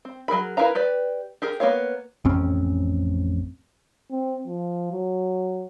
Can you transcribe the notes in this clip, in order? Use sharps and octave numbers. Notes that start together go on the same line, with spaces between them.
C4
F#3 G#4 A#4 B5
E4 A#4 B4 F5 A#5
G4 B4 D5
G4 G#4 A#4
A#3 B3 E4 C#5 F5
A1 F2 C4 C#4
C4
F3
F#3